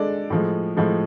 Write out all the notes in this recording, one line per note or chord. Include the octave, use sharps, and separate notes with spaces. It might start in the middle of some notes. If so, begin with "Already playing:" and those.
Already playing: G#3 D4 A4 D5
A2 F3 G#3
A2 F3 G#3